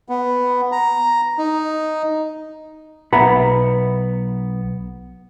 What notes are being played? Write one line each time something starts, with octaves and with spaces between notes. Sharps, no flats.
B3
A#5
D#4
B1 B3 E5 F#5 A#5 B5